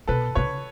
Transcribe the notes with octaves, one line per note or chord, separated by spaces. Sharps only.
B2 A4 B4
C#3 B4 C#5